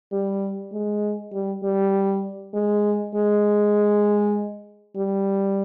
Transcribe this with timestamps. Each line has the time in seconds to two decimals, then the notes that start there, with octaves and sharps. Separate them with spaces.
0.12 G3
0.72 G#3
1.32 G3
1.63 G3
2.54 G#3
3.15 G#3
4.96 G3